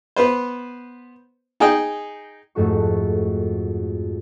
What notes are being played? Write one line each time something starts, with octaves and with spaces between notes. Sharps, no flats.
B3 B4 C5
D#4 G#4 D#5 G5
F2 G#2 A3 F#4 C#6